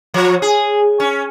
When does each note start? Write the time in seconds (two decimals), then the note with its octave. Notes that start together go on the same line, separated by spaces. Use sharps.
0.14 F3
0.42 G#4
1.00 C#4